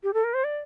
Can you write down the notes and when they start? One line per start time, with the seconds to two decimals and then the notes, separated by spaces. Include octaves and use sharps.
0.03 G4
0.13 A4
0.24 A#4
0.34 C5
0.44 D5